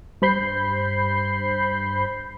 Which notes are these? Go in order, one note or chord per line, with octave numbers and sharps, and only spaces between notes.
G2 C5 B5 G6 C7